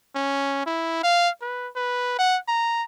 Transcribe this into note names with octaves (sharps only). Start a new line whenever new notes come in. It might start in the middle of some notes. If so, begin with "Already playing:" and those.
C#4
E4
F5
B4
B4
F#5
A#5